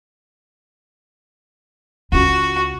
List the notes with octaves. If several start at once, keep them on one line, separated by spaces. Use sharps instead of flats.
C#2 F4 F#4